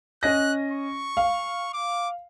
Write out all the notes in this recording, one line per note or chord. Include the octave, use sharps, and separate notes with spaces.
C#4 D#5 F#6 A#6
C#6
F5
D6